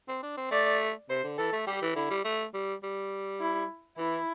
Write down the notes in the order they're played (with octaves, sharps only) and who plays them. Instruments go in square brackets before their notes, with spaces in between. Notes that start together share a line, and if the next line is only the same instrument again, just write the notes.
[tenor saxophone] C4
D4
C4
[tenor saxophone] A3 [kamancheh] D5
[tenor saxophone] C3 [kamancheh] C5
[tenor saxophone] D3
[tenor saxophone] E3 [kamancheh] A4
[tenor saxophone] A3
[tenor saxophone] G3 [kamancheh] G4
[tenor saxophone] E3
[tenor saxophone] D3 [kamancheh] E4
[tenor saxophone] G3
A3
G3
G3
[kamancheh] E4
[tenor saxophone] E3 [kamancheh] E4